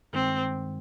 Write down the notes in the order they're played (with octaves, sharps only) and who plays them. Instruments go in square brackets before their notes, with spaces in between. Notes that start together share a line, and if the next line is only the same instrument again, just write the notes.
[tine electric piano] G2 D#3 G#3 [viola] C4